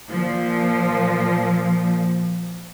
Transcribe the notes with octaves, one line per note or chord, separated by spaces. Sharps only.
A#2 F3